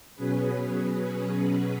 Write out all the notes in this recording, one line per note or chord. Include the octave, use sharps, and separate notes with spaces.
B2 F#3 C#4 G#4 B4